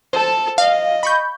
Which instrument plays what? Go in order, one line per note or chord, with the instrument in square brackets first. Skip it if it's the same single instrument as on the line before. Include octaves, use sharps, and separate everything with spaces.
[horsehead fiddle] A4 A5 [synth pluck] C5
[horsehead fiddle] D#5 [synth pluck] F5
[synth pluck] B5 C#6 G6